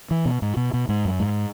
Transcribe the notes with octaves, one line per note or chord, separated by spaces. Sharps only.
E3
B2
G#2
B2
B2
G#2
F#2
G#2